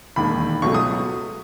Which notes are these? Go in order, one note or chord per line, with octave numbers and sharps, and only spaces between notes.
E1 D#2 D#3 B5
C#2 B2 F#3 A3 C#6
D#6